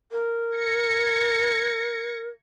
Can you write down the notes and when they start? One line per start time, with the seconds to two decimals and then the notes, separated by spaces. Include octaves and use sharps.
0.12 A#4
0.53 G#6 A#6 C#7